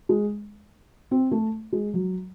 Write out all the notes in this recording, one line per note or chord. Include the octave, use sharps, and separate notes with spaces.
G#3
C4
A3
G#3
F#3